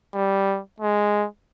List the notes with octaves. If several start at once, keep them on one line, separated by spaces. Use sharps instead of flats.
G3
G#3